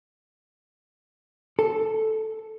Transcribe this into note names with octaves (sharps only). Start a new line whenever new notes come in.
A4